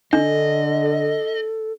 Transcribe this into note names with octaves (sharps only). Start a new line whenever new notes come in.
D3 D4 A4 D#5